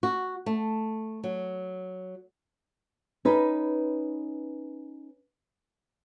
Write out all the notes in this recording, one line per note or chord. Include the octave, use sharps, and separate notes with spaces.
F#4
A3
F#3
C#4 D#4 B4